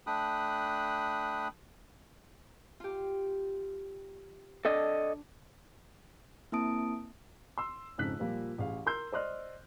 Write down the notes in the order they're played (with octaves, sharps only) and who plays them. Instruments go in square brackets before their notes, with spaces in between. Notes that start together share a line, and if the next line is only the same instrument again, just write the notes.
[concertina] A3 D4 G5 B5 D#6 F#6
[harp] F4 G4
[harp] D4 [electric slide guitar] A4 D5 D#5
[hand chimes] A#3 C4 E4 A5 D#6 D7
[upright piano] C6 E6
F2 G#2 C#3 D#4 F#6 B6
A#2 F3 G3 A#3
A1 G#4 F5
A#4 C6 E6 G6
C5 D5 D#5 C6 F6 F#6